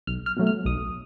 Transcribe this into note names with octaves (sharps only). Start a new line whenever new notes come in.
B1 F6
F6
B2 F#3 A3
F6
B1 D#6